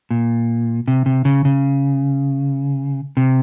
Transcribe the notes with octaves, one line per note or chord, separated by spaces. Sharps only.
A#2
C3
C3
C#3
C#3
C3